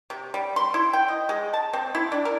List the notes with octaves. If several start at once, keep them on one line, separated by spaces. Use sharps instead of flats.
C3
G3
C6
E4
G5
D#5
G#3
A5
C4
E4
D4
A#4